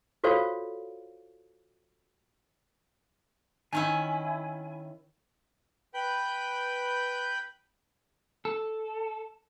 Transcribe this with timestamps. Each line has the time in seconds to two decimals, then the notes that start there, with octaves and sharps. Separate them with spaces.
0.24 F4 F#4 A4 C5 C#5 F5
3.73 D#3 C#4 E4 G#5
5.94 B4 G5 B5 G6
8.45 A4